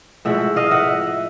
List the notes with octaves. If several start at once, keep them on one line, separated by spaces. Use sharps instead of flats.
A2 F3 G#3 E5 F#5
D#5 F5
E5 F#5